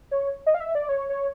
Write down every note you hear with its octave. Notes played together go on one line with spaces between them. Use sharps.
C#5
D#5
F5
E5
D5
C#5
C#5